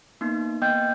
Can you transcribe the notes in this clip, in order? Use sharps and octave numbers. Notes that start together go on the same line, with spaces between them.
A#3 B3 D#4
A#3 B3 D#5 G5 G6